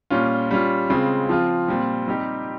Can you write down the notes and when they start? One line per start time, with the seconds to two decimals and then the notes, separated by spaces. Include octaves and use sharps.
0.10 A#2 G3 C#4 F4
0.51 G3 C#4 F4
0.90 C#3 G#3 C4 F4
1.29 F3 C4 F4
1.68 A#2 G3 C4 F4
2.08 G3 C4 D#4 G4